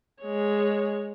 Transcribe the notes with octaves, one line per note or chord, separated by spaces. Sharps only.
G#3 C#5